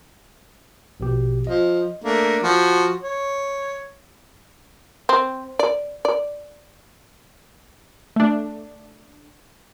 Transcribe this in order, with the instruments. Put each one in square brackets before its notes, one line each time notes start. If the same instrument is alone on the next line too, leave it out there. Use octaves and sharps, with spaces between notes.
[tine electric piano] A#1 B2 G4
[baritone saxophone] F3 [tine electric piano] D#5
[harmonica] A3 A#3 D4
F3 F#4
C#5
[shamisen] C4
D5
D5
[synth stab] A3 D4